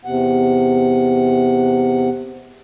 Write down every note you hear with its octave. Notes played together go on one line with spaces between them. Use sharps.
E2 C3 F#5